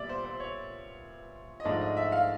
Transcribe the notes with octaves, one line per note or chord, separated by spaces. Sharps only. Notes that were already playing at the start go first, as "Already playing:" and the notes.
Already playing: A#2 G3 B3 D5 E5
C5
C5
C#5
D#5
G#2 F3 A3 D4 D5
D#5
E5
F5